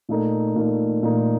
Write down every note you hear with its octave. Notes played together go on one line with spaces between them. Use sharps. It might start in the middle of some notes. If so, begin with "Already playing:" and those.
A#2 A3 D#4 A#4
A#2 A3 D#4 A#4
A#2 A3 D#4 A#4